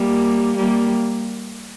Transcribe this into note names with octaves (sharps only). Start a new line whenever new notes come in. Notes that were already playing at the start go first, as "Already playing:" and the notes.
Already playing: G3 A#3
G3 A#3